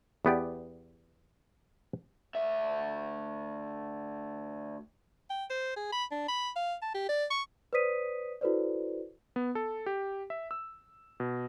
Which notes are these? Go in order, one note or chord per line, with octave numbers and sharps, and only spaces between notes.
E2 B3 G4 D5
D2 E5
G5
C5
G#4
B5
D4
B5
F5
A5
G4
D5
C#6
B4 C5 D5 D#6 B6 D#7
E4 F#4 A4 B4 C5 D5
B3
A4
G4
E5
E6
B2